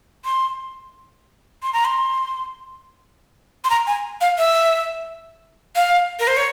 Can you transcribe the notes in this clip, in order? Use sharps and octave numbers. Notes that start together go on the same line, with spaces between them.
C6
C6
A#5
C6
C6
A#5
G#5
F5
E5
F5
A#4
C5
C#5